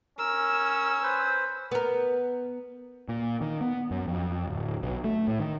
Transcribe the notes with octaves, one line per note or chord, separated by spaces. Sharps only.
C#4 A#4 E6
B4 C5
B3 A#4
A#2
D#3
B3
F#2
F2
D1
B1
A3
A2
D#3